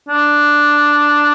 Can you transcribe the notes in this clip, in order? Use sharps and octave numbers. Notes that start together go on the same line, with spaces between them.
D4